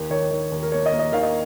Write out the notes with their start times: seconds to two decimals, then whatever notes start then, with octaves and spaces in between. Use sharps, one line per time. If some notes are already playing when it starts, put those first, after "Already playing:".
Already playing: D#2
0.10 D#3 C#5
0.31 D#3
0.52 D#2
0.63 A#4
0.72 A#3 C#5
0.86 D#5
0.92 A#3
0.99 D#5
1.12 D#3 F5
1.23 D#5